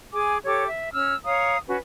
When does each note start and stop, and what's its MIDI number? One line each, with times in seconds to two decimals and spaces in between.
0.13 0.38 68
0.13 0.38 80
0.13 0.38 86
0.45 0.67 67
0.45 0.67 69
0.45 0.67 73
0.45 0.67 86
0.68 0.93 76
0.93 1.14 61
0.93 1.14 88
0.93 1.14 89
1.25 1.58 73
1.25 1.58 77
1.25 1.58 82
1.25 1.58 87
1.68 1.77 61
1.68 1.77 66
1.68 1.77 71